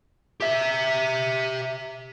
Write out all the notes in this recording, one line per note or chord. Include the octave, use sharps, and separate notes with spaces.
G4 E5